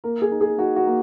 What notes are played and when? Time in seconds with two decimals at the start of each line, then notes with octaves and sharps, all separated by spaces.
0.04 A#3 A#4
0.22 G#4
0.32 D#4
0.41 G#4
0.58 D#4 F#4
0.76 F#4
0.86 A#3